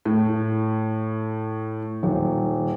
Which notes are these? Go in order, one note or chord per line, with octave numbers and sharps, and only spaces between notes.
A2
D#1